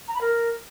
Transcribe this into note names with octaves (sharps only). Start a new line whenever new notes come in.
A#5
B5
A#4